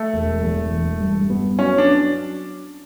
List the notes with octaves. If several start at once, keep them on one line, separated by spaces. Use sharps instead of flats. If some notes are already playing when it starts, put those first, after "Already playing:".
Already playing: A3
E1
E2
E1
G2
B3
F#3 C#4
D4